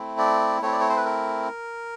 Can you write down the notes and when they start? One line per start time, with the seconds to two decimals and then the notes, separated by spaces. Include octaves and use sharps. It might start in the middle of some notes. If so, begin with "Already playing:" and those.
Already playing: A3 C4 E4
0.18 D5
0.62 A3 C4 E4 C#5
0.72 D5
0.80 C#5
0.89 C5
0.97 B4
1.05 A#4